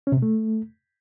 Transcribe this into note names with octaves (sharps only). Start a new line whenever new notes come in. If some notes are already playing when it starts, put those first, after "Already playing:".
C#4
C3
B2
A3